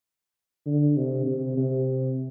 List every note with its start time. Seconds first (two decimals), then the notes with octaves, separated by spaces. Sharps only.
0.66 D3
0.97 C3
1.27 C3
1.57 C3